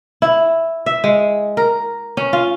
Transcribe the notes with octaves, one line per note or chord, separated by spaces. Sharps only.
E4
E5
G#3
A#4
C#4
F4